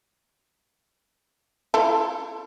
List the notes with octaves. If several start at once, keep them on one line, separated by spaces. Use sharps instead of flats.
E4 F4 A4